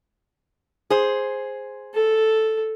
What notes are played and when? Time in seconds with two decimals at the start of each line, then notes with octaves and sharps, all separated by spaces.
0.90 G#4 C5
1.94 A4